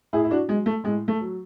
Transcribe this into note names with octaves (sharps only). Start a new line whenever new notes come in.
A2 E4 G#4
E4
D4 F#4
F#3 G#3
A3
A2 G#3
A3
F#3